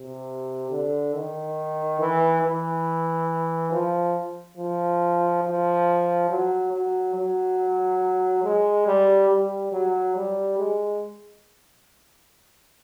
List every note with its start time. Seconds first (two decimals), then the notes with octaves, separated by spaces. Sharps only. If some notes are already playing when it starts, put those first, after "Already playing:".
Already playing: C3
0.71 D3
1.14 D#3
2.00 E3
2.43 E3
3.72 F3
4.57 F3
5.44 F3
6.29 F#3
6.72 F#3
7.15 F#3
8.44 G#3
8.87 G3
9.30 G3
9.72 F#3
10.16 G3
10.58 G#3